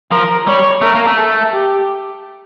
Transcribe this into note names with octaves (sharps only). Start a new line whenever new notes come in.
F3 A#4
G3 C#5
A3 A#4
A#3
A3
A4
G4